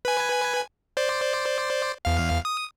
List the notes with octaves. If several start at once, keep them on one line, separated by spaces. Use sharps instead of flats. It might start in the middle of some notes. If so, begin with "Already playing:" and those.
B4 G#5
C5 D5
E2 F5
D#6